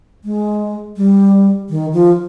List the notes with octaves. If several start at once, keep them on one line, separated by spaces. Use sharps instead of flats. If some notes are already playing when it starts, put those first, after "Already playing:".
G#3
G3
D#3
F3